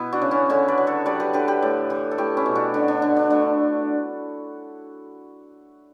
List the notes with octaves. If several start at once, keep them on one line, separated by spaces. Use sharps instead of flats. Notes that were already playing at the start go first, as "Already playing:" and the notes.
Already playing: B2 B3 E4
D4 F#4
C#3
C#4 E4
D3 C#4 E4
B4 D5
F#3
A4 C#5
G3 B4 D5
G4 B4
D3 G4 B4
G4 B4
A2
E3
A4
A3 E4 G4
C#4 E4
B2
D4 F#4
D3 D4
D4
D3 D4
D4
A3 D4